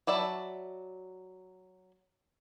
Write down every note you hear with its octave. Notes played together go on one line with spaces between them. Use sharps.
F#3 D5 E5 A5 B5